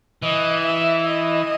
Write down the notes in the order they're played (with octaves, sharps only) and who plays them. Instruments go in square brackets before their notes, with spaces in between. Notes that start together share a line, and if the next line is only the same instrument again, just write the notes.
[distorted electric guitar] E3 [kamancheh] D#5
[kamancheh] E5
D#5